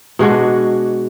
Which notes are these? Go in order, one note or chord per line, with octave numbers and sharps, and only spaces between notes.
B2 G#3 D4 F#4